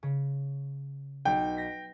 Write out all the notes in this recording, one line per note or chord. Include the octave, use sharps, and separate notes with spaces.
C#3
B1 G5
A#6 B6